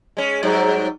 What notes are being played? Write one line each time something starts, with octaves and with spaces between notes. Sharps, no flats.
G#3 C#4
G#2 F#3 G3